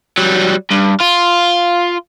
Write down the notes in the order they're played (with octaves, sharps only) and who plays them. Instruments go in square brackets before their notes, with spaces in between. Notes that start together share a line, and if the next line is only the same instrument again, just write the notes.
[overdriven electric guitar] F#3 G3
G2
F4